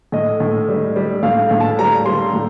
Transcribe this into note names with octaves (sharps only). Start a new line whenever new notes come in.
A2 D#5
A2
G3
G3
A2 F5
A2
A5
G3 A#5
G3 C6
A2